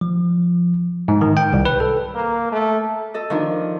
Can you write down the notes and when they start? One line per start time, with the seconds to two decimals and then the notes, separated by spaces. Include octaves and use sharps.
0.01 F3
1.08 G#2
1.21 D#3
1.37 G5
1.53 C2
1.65 B4
1.80 A4
2.15 A#3
2.52 A3
3.14 A4 D#5
3.30 D#3 F3 D4